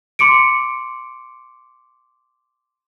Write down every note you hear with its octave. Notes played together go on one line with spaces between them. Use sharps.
C6 D6 C#7 D7